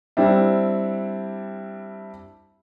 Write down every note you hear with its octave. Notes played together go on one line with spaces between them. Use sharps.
G3 C4 D4 E4